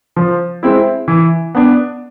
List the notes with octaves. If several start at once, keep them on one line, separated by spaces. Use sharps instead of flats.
F3
G#3 C4 E4
E3
B3 D4